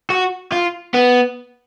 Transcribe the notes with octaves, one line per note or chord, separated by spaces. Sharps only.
F#4
F4
B3